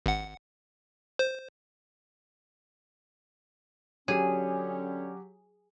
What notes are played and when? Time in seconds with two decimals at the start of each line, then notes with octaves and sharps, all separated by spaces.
0.06 G#1 F#5
1.19 C5
4.08 D3 F#3 C#4 G4 G#4 C#5